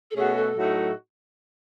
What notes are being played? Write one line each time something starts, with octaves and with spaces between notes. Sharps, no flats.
A4
B2 A3 C#4 F#4 G#4
A4
A2 F#3 A3 D#4 F#4